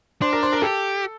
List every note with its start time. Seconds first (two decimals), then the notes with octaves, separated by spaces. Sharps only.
0.22 D4 C5
0.32 A#4
0.43 C5
0.52 A#4
0.62 G4 A4